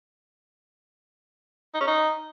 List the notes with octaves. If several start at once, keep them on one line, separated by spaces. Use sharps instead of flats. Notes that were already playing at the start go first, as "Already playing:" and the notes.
D#4
C#4
D#4